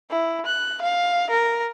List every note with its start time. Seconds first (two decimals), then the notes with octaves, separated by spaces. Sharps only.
0.10 E4
0.46 F#6
0.82 F5
1.30 A#4